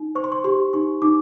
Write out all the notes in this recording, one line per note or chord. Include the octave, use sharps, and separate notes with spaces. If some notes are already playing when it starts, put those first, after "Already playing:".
Already playing: D#4
C5 C#6
C6
C#6
G4 C6
D#4 C#6
D#4 D6